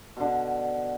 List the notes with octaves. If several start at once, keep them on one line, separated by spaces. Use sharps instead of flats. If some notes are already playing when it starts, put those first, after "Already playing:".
B2 D3